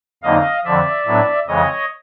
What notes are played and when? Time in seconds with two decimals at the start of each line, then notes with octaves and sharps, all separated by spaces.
0.23 F2 D3 F#3 A#3 D#4 D#5 F5
0.65 F2 D3 F3 D5 E5
1.06 A2 F#3 B3 D4
1.47 F2 C#3 E3 G#3 C#5 D#5